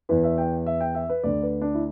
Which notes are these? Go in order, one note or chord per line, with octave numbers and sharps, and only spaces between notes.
E2 E3 B4
E5
G5
E5
G5
E5
B4
D2 D3 D5
B4
D4
E4